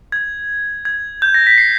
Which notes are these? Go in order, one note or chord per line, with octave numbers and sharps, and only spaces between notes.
G#6
G#6
G6
A#6
B6
C7